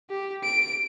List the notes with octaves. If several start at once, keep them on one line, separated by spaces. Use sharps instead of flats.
G4
D7